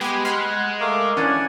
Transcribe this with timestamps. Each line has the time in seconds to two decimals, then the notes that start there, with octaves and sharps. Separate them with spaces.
0.01 G#3 B3 G4 G#5
0.25 F#5 B5 C6 F6
0.81 A3 A#4 F5 D6
1.17 E3 C#4 D4 D5 F#5 G#5